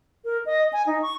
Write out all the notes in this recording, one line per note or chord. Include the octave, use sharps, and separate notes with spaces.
A#4
D#5
G#5
D#4
C#6